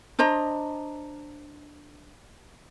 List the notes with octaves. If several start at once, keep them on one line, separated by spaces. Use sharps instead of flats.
D4 C5 D#5 A#5